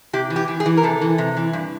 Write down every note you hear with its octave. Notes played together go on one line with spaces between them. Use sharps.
C3 G4
E3
G4
E3
G#4
E3
A#4
C3 A4
E3
C3
E3
G2